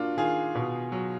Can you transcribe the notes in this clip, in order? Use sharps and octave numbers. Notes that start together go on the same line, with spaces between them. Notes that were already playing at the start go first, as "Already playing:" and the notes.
Already playing: A#3 D4 F4 F#4
D#3 F4 G#4
B2
F#3